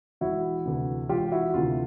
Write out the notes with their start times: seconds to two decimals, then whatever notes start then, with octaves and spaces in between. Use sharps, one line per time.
0.21 E1 E4 F#4
0.65 D2 C3 E3
1.09 E1 F4 G4
1.32 E4 F#4
1.54 D2 C3 E3 F4